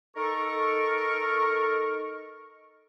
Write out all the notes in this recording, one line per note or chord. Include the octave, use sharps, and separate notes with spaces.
D#4 A4 A#4 C#6